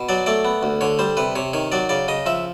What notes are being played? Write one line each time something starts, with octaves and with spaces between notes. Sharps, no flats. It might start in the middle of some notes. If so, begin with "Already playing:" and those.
Already playing: B2
F#3 D5
A3 D5
B3
D2
D3 C#5
G3 C5
C3 B4
C3 C#5
D#3 C#5
F#3 D5
C#3 D5
C#3 D#5
F3 E5